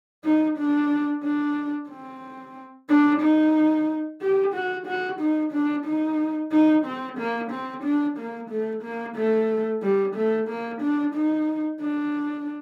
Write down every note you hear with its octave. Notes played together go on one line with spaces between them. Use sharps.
D#4
D4
D4
C4
D4
D#4
G4
F#4
F#4
D#4
D4
D#4
D#4
C4
A#3
C4
D4
A#3
A3
A#3
A3
G3
A3
A#3
D4
D#4
D4